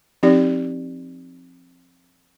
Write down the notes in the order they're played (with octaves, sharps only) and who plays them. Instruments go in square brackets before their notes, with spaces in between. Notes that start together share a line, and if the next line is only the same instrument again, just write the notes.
[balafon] F3 C4 D#4 G4 D5